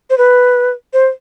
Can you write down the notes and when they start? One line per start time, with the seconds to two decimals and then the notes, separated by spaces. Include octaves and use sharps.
0.10 C5
0.18 B4
0.93 C5